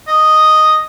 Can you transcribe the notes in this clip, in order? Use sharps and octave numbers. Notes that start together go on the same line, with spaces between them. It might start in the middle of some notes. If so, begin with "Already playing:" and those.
D#5